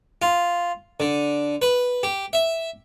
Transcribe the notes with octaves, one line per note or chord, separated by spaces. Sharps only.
F4
D3
B4
G4
E5